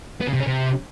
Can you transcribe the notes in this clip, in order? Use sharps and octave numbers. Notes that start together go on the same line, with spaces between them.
B3
C#3
C3
C#4
C3